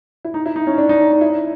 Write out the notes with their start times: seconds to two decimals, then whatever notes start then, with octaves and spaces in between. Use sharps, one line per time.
0.25 E4
0.34 D#4
0.46 E4
0.56 D#4
0.67 C#4
0.78 D4
0.89 D#4
1.00 D4
1.11 D#4
1.21 E4